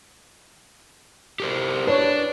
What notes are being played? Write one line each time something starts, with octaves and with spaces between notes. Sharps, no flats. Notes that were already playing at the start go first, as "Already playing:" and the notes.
G4 A#4 C5
D4 B4 C#5